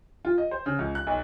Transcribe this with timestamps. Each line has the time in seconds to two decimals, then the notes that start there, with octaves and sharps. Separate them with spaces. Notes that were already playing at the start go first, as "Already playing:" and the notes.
0.25 F4
0.38 D#5
0.51 C5
0.66 C#3
0.79 C#2
0.95 F#6
1.07 B1